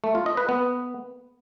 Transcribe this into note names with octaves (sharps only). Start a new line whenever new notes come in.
A3
F4
D#5
B4
B3